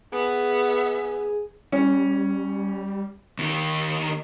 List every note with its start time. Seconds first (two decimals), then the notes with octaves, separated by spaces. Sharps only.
0.12 B3 G#4 E5
1.72 G3 C#4
3.39 D#2 D#3